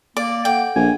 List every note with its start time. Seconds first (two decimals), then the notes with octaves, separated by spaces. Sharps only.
0.17 A#3 D5
0.45 A4 F#5 G5
0.76 A#1 G#5